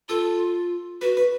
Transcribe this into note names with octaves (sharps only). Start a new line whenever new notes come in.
F4 A4
F#4 B4
B4